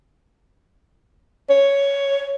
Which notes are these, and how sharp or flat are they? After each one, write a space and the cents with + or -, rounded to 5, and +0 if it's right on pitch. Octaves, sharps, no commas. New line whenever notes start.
C#5 +5